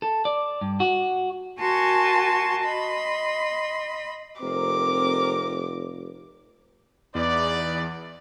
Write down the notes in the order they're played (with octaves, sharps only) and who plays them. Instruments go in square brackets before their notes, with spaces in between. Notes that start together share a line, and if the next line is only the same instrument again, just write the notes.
[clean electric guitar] A4
D5
G2
F#4
[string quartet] F#4 A#4 G#5 A5 C6 C#6
D#5 B5 C6
[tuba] F1 [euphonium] C4 [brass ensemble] A#4 [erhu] D6
[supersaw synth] E2 [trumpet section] D#4 B4 D5